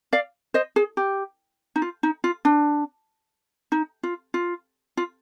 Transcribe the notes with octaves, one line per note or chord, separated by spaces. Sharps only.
D5 F5
C5 D#5
G#4
G4
D#4
F4
D#4
F4
D4
D#4
F4
F4
F4